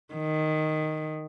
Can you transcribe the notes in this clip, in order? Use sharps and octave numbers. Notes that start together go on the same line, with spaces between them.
D#3